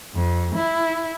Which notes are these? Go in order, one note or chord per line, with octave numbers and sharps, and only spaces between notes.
F2
E4